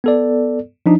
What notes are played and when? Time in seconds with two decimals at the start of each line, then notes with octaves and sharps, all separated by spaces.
0.04 B3 A4 D5
0.86 F3 D4 D#4